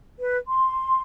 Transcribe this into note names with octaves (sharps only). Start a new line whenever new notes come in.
B4
C6